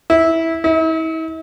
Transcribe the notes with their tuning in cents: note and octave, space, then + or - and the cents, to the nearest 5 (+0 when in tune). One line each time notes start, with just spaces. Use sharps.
E4 -10
E4 -40